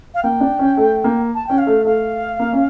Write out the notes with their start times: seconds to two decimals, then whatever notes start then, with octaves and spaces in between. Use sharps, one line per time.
0.15 F5
0.23 A#3 G5
0.41 D4
0.59 C#4
0.77 A3
1.04 A#3
1.35 A5
1.47 C#4 G5
1.58 F5
1.67 A3
1.85 A3 F5
2.39 A#3
2.53 C#4